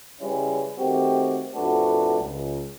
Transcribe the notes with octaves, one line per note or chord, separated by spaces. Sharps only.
C#3 E3 G3 G#3 C#4 E4
D#3 A3 C4 F#4 G4
A1 F2 A3 D4 F#4 B4
C#2